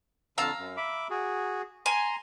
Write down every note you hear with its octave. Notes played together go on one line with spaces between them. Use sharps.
F2 D3 F5 A5 A#5 E6
F#2
E5 B5 D6
F#4 G#4
G#5 A#5 C6